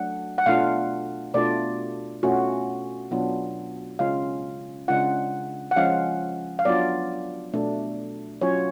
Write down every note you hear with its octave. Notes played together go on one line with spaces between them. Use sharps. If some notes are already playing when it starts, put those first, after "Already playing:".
Already playing: F#3 A3 D4 F#5
F#5
B2 A3 D4 F4 F5
B2 A3 D4 F4 D5
B2 A3 C#4 F4 F#4
B2 F#3 B3 D4 F4
C#3 G#3 C#4 F4 F5
C#3 G#3 D4 F4 F#5
F#5
F3 G#3 C#4 F4 F5
F5
F#3 B3 D4 F4 D5
B2 A3 D4
F#3 C#4 F4 C#5